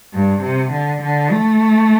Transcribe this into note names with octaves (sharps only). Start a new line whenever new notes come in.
G2
C3
D3
D3
A3